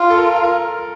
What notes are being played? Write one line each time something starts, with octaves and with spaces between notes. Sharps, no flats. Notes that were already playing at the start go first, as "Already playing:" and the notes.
Already playing: F4
A4
A#4
A#4